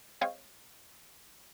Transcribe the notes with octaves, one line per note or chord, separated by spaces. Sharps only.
G#3 C4 C#5 D#5 F5 G5